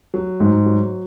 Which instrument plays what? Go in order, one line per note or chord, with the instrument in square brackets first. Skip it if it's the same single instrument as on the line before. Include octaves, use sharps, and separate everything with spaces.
[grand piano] F#3
G#2
F#3